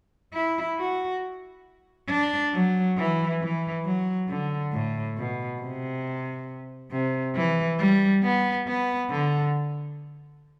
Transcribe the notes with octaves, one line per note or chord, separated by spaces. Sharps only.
E4
F#4
D4
F#3
E3
E3
F#3
D3
A2
B2
C3
C3
E3
G3
B3
B3
D3